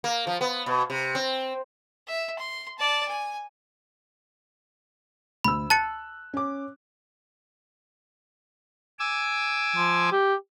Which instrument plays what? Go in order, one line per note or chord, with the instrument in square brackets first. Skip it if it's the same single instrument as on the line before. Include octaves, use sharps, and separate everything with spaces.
[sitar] A#3
F3
B3
B2
C3
C4
[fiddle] E5
C6
D5 A5
G#5
[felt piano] D2 E6 [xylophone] B5
[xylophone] A5 A6 C#7 [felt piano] F#6
[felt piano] C#4 D6
[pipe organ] G#5 D6 E6
[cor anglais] F3
G4